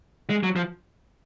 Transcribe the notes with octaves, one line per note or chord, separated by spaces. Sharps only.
G#3
F#3
F3